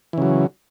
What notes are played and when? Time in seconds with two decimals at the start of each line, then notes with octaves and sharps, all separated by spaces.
0.13 E3
0.18 C#3
0.22 F#3